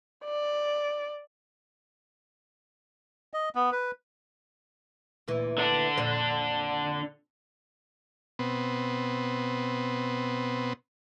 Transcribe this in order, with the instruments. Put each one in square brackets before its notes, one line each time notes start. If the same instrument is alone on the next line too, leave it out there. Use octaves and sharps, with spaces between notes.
[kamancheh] D5
[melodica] D#5
B3
B4
[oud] D2 A#2 E3
[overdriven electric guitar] D3 D4
[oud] F2 A#2 C5
[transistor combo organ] B2 B3 C4